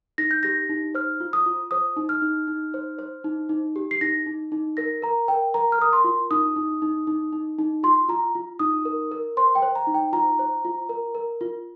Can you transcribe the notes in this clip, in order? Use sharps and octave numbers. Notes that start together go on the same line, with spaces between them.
D#4 A#6
G6
G4 A#6
D#4
C5 F6
F4
D#6
F4
C5 D#6
D#4
F6
D#4
D#4
C5
C5
D#4
D#4
G4
C7
D#4 A#6
D#4
D#4
A#4 A#6
A#4 A#5
A#4 G5
A#4 A#5
F6
A#4 D#6
C6
F4
D#4 D#6
D#4
D#4
D#4
D#4
D#4
F4 C6
F4 A#5
F4
D#4 D#6
A#4
A#4
C5 C6
G5
C5
A#5
D#4
G5
F4 A#5
C5
F4
A#4
A#4
F4